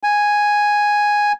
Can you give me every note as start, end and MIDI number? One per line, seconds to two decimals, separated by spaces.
0.03 1.32 80